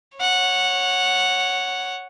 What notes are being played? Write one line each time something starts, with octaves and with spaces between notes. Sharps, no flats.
C#5 F#5